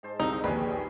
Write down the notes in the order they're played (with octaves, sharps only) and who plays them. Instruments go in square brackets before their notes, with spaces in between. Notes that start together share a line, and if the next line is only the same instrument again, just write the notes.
[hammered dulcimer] G#2 C5 A5
[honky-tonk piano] C2 [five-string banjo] D#4 [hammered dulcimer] A#4 E5
[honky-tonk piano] A#1 D#2 [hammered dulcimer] G3 G#4 [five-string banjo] B4